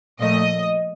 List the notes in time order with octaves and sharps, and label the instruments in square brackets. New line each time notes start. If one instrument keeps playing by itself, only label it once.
[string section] A#2 F3 A3 D#5